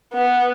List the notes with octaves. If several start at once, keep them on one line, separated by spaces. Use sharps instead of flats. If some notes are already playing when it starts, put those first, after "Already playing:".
B3